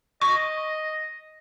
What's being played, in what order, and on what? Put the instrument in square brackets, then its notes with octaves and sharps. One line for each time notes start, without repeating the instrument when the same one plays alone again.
[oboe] D#5 [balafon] C#6